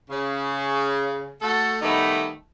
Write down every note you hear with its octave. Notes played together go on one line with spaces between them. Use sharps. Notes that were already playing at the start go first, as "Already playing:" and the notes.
C#3
A3 F#4 A4
D#3 G3 A3 B3 D#4